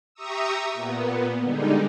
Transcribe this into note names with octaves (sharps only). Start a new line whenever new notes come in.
G4 E5 A#5 C#6 D#6 E6
A#2 B3
D3 G3 G#3 D#4